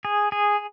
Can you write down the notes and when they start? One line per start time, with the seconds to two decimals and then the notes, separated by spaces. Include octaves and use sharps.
0.05 G#4
0.32 G#4